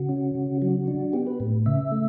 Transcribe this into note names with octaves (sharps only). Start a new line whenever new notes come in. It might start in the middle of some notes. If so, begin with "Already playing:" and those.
Already playing: C#3 F#4
C#4
C#3
F#3 F#4
D4
B3 G4
B4
A2
C#3 E5
A3